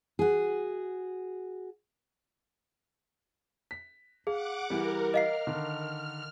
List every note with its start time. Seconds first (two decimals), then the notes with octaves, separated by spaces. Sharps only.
0.19 F#4 G#4
3.71 B6
4.27 G#4 F5 F#5 D6
4.70 E3 G3 A#4
5.14 D#5 F5 F6 C7
5.47 D3 D#3